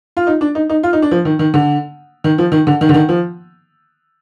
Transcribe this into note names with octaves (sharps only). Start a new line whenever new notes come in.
F4
D#4
D4
D#4
D#4
F4
D#4
D4
F3
D#3
D#3
D3
D#3
F3
D#3
D3
D#3
D3
D#3
F3